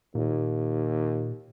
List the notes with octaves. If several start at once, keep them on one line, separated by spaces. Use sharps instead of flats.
D#2 A#2